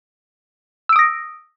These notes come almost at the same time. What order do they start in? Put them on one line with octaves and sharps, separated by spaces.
E6 D7 D#6 A#6